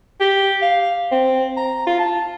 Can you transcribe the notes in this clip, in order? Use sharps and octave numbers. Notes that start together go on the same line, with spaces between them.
G4
F5
C4
A#5
F4
A5